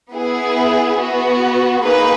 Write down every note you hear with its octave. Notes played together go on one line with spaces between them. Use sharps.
B3 E4 G#4
B3 F#4
A#3 D#4 G#4 B4